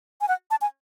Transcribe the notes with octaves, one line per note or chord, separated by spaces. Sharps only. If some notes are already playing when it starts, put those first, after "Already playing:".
G#5
F#5
A5
G#5